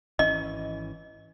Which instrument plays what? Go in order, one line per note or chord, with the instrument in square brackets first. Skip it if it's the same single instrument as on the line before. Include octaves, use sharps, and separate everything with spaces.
[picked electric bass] G#1 E3 C#4 [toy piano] D#5